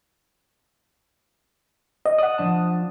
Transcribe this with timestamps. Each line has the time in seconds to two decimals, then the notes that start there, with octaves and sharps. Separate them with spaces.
2.06 D#5
2.18 D5 F#5 D#6
2.38 F3 D4 A5